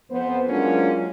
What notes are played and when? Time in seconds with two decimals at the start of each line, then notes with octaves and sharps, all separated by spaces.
0.11 F2 B3 C5
0.48 F#3 G#3 A#3 C#4 D4 F4